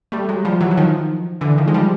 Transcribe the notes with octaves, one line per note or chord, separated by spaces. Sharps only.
G3 A3
F#3 G#3
F3 G3
E3 F#3
F#3
D#3 F3
D3 E3
D#3 F3
G#3
F3 G3